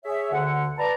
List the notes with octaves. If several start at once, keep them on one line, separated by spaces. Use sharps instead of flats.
G#4 C#5 E5
D2 D3 F#5
B4 D5 A5 A#5